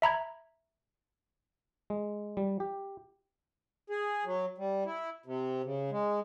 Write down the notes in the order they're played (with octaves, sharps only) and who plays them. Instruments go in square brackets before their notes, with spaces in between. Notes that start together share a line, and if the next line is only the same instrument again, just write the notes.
[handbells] E5 A#5 B5 G#6
[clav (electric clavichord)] G#3
G3
G4
[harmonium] G#4
F#3
G3
E4
C3
C#3
G#3